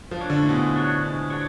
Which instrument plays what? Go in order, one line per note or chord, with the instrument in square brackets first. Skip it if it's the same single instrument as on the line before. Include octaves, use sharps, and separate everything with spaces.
[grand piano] F3
[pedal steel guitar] D4 F#4 C#5
[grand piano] D3
A2
[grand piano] B2 [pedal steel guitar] G#3
[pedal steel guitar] D4 F#4 C#5
G#3
D4 F#4 C#5